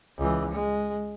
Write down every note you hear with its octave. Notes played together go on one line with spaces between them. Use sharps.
C#2 E3
G#3